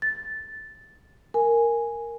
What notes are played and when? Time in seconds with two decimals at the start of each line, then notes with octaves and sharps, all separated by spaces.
0.02 A6
1.34 A#4 G#5